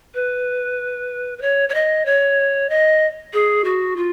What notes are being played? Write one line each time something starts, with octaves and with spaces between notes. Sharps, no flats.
B4
B4
C#5
C#5
D#5
C#5
D#5
G#4
F#4
F4